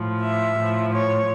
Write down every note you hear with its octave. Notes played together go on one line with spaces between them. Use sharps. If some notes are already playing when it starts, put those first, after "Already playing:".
Already playing: A2 F3
E5
A2 F3
C#5